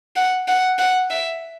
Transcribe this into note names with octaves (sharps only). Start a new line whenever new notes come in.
F#5
F#5
F#5
E5